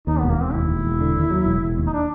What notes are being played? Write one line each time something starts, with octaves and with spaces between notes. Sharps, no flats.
D#2 D#4
E1 B3
A#3
E1 C4
D#2 E4
E1
E1
D3
D#2
F#3
E1
E1
D#2
D#4
D4